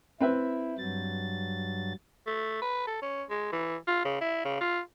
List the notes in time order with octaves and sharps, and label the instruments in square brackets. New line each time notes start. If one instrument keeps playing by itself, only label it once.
[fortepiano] C4 B4 E5 [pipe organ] E4
[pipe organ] G2 F#3 A6
[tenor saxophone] A3
B4
A4
C#4
G#3
E3
F4
C#3
E4
C#3
F4